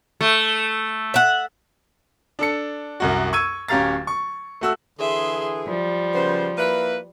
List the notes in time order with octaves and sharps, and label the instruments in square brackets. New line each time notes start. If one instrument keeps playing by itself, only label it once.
[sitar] A3
[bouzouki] E5 F#5
[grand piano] D4 A4 C#7
C2 F#2 F#4
C#6 E6 G#6 D#7
D1 C#4 G4 F5 A#5 A6
C#6
A3 F#4 E6
[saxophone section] D3 E3 G#4 [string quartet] E5 C6
[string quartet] F3 G3
[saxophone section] C#3 B3 C5
A#3 E4 B4